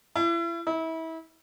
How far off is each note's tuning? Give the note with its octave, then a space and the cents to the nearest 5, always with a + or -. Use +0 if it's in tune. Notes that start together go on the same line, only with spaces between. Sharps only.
E4 +35
E4 -30